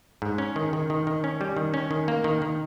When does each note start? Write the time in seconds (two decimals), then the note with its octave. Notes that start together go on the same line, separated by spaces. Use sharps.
0.22 G#2
0.38 C#4
0.56 D#3
0.73 D#3
0.90 D#3
1.07 D#3
1.24 C#4
1.41 G3
1.57 D#3
1.74 C#4
1.91 D#3
2.08 A#3
2.24 D#3
2.42 D#3